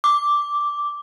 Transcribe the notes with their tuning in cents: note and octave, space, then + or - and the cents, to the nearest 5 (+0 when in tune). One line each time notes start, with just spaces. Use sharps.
D6 -5